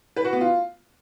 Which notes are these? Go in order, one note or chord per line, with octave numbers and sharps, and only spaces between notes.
B4
F#4
B3
F4